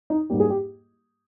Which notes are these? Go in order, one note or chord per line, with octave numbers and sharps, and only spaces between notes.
D#4
G#2 G3 A#3 G4
G#4
G4